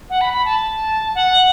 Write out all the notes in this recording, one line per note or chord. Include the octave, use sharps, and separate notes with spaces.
F#5
B5
B5
A5
F#5